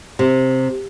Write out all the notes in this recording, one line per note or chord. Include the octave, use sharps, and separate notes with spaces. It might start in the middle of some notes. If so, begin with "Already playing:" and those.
C3